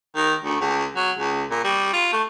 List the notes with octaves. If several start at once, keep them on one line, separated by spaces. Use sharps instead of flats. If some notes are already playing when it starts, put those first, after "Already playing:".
D#3
D2
C#2
F#3
C#2
A#2
G3
F4
A3